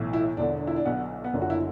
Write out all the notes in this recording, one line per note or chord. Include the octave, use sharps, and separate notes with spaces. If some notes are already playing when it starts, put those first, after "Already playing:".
Already playing: B1 A2 E3
E4
E1 E2 D3 D4
E4
D4
B1 B2 B3
B3
F#1 F#2 D3 D4
F#4
E4